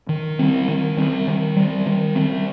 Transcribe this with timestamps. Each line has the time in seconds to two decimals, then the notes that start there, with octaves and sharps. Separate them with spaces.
0.09 D#3
0.39 G3 C4
0.68 D#3
0.97 G3 C4
1.27 D#3
1.56 G3 C4
1.86 D#3
2.15 G3 C4